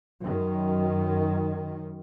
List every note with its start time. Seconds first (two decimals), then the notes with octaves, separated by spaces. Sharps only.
0.20 F#2 D#3